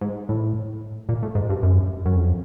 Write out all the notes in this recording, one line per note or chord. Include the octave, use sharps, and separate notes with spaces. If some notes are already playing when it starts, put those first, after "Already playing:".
G#2
A2
A#2
A2
G#2
G2
F#2
F#2
F2